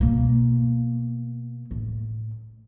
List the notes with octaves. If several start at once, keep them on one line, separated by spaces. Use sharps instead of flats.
B2 A#3
A2